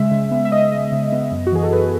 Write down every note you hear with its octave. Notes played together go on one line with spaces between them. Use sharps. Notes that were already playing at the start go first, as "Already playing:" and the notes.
Already playing: C#3 G#3 E5
C#3
B3
E5
C#3 D#5
G#3 D#5
C#3
B3
F#2
F#4
E3 G#4
A4
F#2 B4